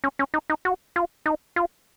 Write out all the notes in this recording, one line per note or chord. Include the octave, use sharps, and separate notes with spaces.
C#4
C#4
D#4
D#4
F#4
F4
D#4
F4